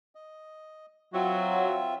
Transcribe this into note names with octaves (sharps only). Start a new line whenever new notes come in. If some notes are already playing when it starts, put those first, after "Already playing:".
D#5
F#3 C4 F4 E5